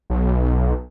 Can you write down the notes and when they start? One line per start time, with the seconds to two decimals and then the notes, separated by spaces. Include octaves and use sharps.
0.10 B1